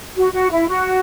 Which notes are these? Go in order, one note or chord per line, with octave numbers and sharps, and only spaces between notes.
F#4
F#4
E4
F#4